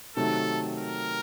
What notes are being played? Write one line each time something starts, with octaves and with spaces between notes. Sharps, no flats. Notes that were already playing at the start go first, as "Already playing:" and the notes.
C3 D#3 F#3 A3 C4 A4
A#4